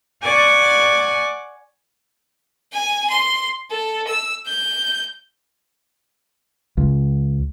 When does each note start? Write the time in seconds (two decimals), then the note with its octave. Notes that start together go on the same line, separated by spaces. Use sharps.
0.23 D5 F#5 G#5 C#6 D6
2.72 G#5
3.09 C6
3.70 A4
4.08 E6
4.47 G6
6.77 C#2